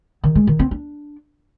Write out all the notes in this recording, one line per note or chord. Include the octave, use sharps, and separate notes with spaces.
D#3
G#3
D#3
C4
D4